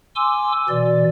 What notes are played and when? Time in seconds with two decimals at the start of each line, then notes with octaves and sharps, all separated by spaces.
0.16 G#5 C6 D6 E6
0.69 B2 E3 D5